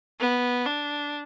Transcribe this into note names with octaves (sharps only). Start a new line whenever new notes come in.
B3
D4